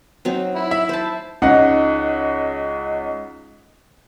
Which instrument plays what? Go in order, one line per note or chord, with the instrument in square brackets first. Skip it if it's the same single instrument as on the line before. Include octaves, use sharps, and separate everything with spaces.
[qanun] F#3 C4 D#4
[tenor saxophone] E4
[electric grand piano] E5 [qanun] B5
[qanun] C5 A5
[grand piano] C#2 D#4 F#5